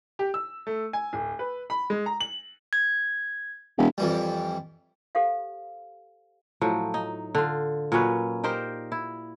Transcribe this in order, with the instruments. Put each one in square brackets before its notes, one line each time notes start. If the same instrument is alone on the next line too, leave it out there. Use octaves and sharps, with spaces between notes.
[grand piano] G4
E6
A3
G#5
D1
B4
B5
G#3
A#5
F#7
[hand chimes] G#6
[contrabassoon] E1
[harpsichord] F2 E3 G3
[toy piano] G4 A4 C5 F5 F#5
[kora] A2 F3 F#3
D#4
D3 F4
A#2 F#3 C#4 B4
D#4 G4 A#4 C5
E4